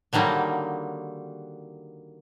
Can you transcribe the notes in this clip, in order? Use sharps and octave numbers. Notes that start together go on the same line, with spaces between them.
D3 D#3 F#3 G3 A#3